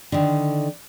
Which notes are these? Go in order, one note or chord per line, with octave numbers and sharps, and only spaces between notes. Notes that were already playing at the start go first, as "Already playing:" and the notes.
D3 D#3